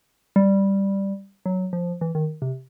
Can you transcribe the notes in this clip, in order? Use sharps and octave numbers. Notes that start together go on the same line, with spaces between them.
G3
F#3
F3
E3
D#3
C3